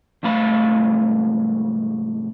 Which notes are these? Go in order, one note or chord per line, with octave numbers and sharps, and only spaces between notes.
C2 G#2 A3 F5 B5